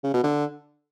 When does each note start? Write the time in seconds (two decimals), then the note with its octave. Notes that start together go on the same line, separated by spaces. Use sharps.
0.04 C#3
0.14 B2
0.24 D3